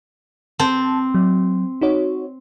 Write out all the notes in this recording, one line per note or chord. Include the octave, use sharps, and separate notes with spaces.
C4 A5
F#3
D#4 F#4 C#5